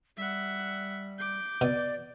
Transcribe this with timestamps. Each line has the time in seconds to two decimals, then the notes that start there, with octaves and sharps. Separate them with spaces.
0.17 G3 E5 F#5
1.18 D6 G6
1.61 B2 D5